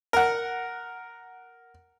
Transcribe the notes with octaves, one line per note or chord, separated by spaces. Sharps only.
A#4 F#5